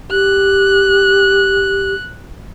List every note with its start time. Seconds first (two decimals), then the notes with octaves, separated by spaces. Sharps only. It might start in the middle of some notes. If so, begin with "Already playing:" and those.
0.10 G4 F#6